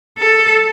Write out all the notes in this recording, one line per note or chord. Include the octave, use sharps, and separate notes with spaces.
A4